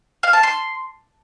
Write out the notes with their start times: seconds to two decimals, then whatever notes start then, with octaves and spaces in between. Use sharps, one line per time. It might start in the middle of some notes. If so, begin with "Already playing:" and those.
0.23 F5
0.33 A5
0.43 C6